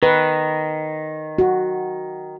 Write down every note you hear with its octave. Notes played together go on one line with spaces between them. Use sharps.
D#3 B4
F#4